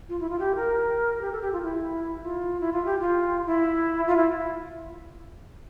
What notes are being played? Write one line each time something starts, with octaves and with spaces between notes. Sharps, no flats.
F4
E4
F4
G4
A#4
G4
A4
G4
F4
E4
F4
E4
F4
G4
F4
E4
F4
E4